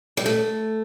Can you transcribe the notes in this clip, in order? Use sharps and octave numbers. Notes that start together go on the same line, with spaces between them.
G3
A3